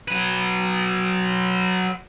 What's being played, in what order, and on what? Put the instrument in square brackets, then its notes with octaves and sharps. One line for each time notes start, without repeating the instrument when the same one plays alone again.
[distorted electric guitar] F#3 B4